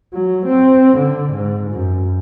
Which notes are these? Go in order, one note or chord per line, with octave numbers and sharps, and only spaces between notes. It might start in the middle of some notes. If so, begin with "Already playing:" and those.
F#3
C4
D3
G#2
F#2